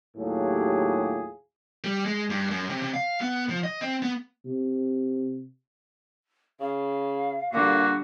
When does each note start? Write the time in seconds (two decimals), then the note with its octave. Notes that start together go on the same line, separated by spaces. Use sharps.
0.17 D#2 A2 F#3 F4 G4 G#4
1.84 G3
2.05 G#3
2.30 G2
2.50 F#2
2.69 C3
2.82 C3
2.94 F5
3.21 B3
3.50 F3
3.64 D#5
3.81 C4
4.02 B3
4.45 C3
6.60 C#3 F5
7.53 A#2 D3 G3 F#4